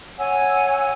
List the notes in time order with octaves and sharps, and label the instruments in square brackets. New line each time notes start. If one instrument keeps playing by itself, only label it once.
[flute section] C#5 F#5 G#5 E6